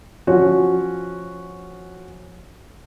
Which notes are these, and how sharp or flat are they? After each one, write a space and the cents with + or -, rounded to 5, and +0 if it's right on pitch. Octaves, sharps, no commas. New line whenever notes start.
F3 +0 C#4 +0 F#4 +0